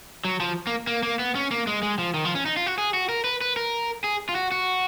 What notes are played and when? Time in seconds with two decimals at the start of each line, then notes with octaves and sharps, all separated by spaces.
0.25 F#3
0.40 F3
0.67 A#3
0.87 A#3
1.03 A#3
1.19 B3
1.35 C#4
1.51 A#3
1.67 G#3
1.83 G#3
1.98 F3
2.14 D#3
2.25 F3
2.35 C#4
2.46 D#4
2.57 F4
2.66 F#4
2.78 G#4
2.94 F#4
3.09 A#4
3.24 B4
3.41 B4
3.56 A#4
4.04 G#4
4.29 F4
4.35 F#4
4.52 F#4